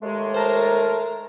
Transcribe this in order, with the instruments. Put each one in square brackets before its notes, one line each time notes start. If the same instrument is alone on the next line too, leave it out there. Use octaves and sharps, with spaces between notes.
[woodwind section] D#2 G#3 [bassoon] A3
[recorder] A#4 [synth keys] C5 A5 A#5